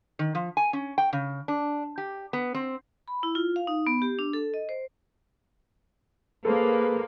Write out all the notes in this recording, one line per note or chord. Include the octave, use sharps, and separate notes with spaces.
D#3
F3
G#5
C#4
G5
C#3
D4
G4
B3
C4
B5
E4
F4
F5
D#4
B3
G4
D4
A4
D#5
C5
A#3 G#4 A4 B4 C5